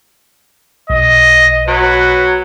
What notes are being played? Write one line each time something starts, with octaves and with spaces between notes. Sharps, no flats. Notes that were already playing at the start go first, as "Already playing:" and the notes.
B1 D#5
F#3 B4